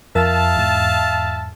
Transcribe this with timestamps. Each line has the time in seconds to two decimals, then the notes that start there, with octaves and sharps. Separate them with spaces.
0.15 F2 A#4 E5 F5 A5
0.57 E2 G#2